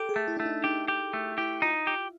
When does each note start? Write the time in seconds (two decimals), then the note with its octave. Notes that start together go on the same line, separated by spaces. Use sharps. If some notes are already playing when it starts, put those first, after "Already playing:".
Already playing: G4 A4
0.09 G#4
0.16 A3
0.28 E4
0.37 A3 D4
0.46 D#4
0.64 D#4 G4
0.88 G4
1.13 A3
1.38 E4 G4
1.62 D#4 F4
1.87 G4